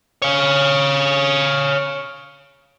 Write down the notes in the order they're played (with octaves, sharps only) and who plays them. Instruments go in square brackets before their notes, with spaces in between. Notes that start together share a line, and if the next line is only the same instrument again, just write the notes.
[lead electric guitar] C#5 F5